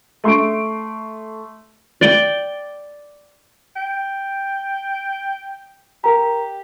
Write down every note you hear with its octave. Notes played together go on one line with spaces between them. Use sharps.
A3 C6 C#6 D7
D5 G5
G5
G4 A#4 A#5